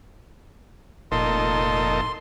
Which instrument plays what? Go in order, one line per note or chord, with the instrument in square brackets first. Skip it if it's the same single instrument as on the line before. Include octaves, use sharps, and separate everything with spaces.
[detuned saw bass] F1 [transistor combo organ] A#2 D#4 A4 [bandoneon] C6